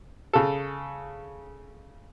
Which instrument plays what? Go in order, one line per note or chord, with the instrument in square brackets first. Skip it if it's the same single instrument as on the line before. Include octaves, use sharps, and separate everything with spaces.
[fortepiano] C#3 A4